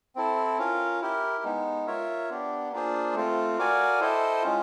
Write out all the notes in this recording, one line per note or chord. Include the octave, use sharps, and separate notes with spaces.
C4 E4 A4
C#4 F4 A#4
E4 G4 A#4
G#3 B3 D#4
F4 A#4 C#5 E5
B3 D4 G4
A#3 D4 F4 G#4 C5
A3 C4 F4
F#4 A#4 D5 F5 G#5
E4 A4 C5 D#5 G5
G#3 C#4 F4